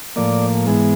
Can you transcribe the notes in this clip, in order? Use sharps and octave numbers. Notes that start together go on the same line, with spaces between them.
A2 F3 A#3 D5
G#2 E3 G#3 B3